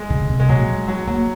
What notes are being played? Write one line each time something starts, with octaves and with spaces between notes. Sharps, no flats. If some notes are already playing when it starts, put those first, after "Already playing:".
Already playing: G#3
C#3
C3
G#3
A#2 F#3
G#3
F#3
F#3 A#3